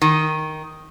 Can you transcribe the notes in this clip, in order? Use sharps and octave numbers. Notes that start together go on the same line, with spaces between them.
D#3